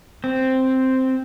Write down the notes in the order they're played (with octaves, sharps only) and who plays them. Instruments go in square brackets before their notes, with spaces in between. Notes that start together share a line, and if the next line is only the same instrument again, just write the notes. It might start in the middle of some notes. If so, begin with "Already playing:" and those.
[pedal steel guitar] C4